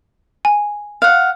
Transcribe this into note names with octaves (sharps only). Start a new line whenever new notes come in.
G#5
F5 F#5